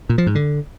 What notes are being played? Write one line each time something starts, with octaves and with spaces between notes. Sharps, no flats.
A#2
F3
G#2
D3